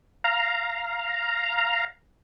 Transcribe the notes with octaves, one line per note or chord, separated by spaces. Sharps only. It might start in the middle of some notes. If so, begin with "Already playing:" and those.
F5 A#5